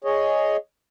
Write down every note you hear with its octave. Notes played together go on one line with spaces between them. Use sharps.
G#4 C#5 D#5